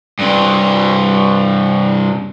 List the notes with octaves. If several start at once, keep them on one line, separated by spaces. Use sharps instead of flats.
G2 C3